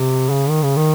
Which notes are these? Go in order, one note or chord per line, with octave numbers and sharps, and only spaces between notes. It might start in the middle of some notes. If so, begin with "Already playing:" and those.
Already playing: C3
C#3
D#3
C#3
D#3